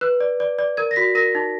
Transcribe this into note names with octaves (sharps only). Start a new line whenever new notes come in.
B4 F#6
D5
D5
D5
A#4 G#6
A#6
F#4 B6
A#4 A#6
D#4